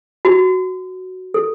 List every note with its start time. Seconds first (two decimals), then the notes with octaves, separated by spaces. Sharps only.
0.25 F#4
1.34 A4